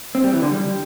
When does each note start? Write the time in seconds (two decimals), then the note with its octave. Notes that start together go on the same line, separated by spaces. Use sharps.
0.15 C4
0.24 G3
0.33 E3
0.42 D3
0.51 G3